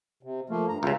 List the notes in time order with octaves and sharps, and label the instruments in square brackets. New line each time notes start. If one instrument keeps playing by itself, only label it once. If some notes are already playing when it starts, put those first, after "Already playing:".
[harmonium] C3
F3 A3 A#3
G2 A#5
[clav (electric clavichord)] C#2 C#3 [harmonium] E5 F5 A#5